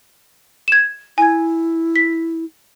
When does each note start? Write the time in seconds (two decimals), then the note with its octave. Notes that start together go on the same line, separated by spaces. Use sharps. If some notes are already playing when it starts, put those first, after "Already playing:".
0.68 G#6 E7
1.18 E4 G#5 G#6
1.96 B6